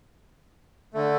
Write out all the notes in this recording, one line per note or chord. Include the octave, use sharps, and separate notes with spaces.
D3 A3